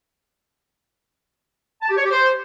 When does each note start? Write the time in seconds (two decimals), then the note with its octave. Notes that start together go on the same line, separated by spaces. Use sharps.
1.82 A5
1.89 G4
1.96 C#5
2.04 G4
2.11 C5